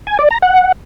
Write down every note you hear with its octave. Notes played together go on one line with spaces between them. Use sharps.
G#5
D5
A#5
F#5